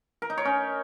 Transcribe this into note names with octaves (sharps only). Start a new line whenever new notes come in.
A#4
D#4
C#5
C#4